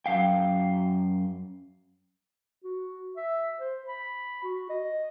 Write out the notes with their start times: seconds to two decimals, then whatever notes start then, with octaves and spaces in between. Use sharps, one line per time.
0.06 F#2 F5 G5
2.64 F#4
3.17 E5
3.60 C5
3.87 B5
4.44 F#4
4.70 D#5